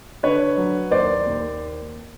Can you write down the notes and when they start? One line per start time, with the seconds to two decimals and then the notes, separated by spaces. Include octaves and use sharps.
0.23 D3 B4 C#5
0.57 F#3
0.91 D#2 C5 D5
1.26 D#2